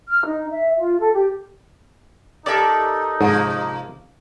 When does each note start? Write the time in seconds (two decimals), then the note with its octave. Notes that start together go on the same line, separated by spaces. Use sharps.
0.08 F6
0.26 D#4
0.52 E5
0.78 F4
0.99 A4
1.14 G4
2.46 D#4 G4 A4 A#4 D5 E5
3.21 G#2 C3 F3 A#3